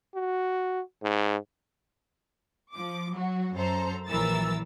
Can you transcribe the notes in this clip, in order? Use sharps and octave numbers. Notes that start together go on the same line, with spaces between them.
F#4
G#2
F3 D6
F#3 F#4
F#2 A4 C5 A#5
A#1 E3 F#3 A#4 E6 A6